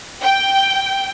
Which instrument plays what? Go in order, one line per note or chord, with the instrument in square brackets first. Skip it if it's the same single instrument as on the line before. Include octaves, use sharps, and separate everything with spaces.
[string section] G5